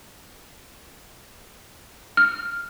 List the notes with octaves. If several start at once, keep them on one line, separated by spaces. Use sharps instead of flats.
F6